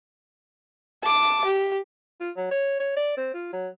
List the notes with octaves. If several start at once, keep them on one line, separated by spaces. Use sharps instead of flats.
A5 D6
G4
F4
F#3
C#5
C#5
D5
C4
F4
F#3